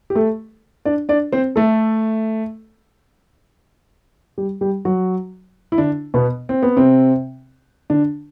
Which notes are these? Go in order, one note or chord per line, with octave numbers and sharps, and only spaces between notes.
G4
A3 A4
D4 D5
D4 D5
C4 C5
A3 A4
G3 G4
G3 G4
F#3 F#4
E4
D3 D4
B2 B3
C4
B3
C3 C4
D3 D4